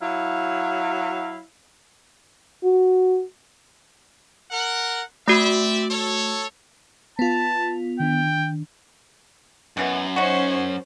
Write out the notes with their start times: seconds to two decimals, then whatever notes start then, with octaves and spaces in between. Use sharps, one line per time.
0.01 F#3 E4 F5
2.64 F#4
4.51 A#4 F#5
5.28 A3 C4 F#4 D5 E5
5.90 A4 C#5
7.19 B3 F4 A5
8.00 D#3 D4 G5
9.77 F#2 B2 E3 B3
10.16 C#4 D#4 F#4 C5